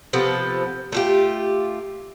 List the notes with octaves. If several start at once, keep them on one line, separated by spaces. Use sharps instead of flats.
C3 F3 B3 A4
A3 F4 G4